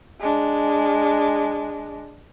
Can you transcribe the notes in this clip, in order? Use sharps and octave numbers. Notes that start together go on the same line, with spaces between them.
G#3 D4